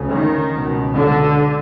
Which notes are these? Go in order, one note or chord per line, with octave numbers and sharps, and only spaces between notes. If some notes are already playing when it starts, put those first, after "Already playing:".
Already playing: D2 C#3
D#3
C#2 B2
D3